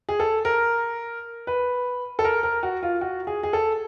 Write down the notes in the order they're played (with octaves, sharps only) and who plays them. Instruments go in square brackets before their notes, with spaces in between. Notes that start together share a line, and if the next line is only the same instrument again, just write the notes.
[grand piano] G#4
A4
A#4
B4
A4
A#4
A#4
F#4
F4
F#4
G#4
G#4
A4